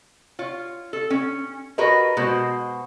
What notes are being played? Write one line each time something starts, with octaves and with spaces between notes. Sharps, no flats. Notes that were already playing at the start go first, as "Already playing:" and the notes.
F4 C#5
A4
C#4
F#4 G#4 A#4 B4 C#5 D#5
B2 G#3 F#4 C5